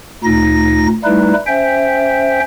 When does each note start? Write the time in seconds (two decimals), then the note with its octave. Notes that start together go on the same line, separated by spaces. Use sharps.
0.24 D2 A#2 D#4 A#6
1.04 G3 A3 D#4 E4 B4
1.47 C#4 C5 E5 G5